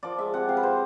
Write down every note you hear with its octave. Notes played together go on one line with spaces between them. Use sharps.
F3 D5
G#3 E5
C3 F#5
C3 F5
B4
F3 C5